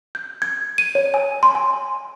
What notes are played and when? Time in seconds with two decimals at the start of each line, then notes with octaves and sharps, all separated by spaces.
0.15 G6
0.42 G#6
0.78 D#7
0.95 C#5
1.14 G#5
1.43 C6
1.55 G#5